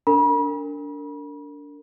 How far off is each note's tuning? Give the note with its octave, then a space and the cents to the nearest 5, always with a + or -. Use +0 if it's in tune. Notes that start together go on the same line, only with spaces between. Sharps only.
D4 -20 A#4 -30 B5 -40